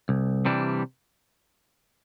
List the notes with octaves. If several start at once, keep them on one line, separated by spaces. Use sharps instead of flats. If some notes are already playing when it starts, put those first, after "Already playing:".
C2
C3 E3 G3 D4